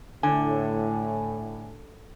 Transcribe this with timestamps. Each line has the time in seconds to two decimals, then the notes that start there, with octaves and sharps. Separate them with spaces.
0.23 A2 D3 G#5